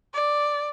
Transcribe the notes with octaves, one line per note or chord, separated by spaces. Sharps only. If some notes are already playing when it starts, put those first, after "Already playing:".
D5